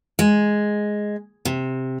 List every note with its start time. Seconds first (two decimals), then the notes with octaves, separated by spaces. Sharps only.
0.19 G#3
1.45 C3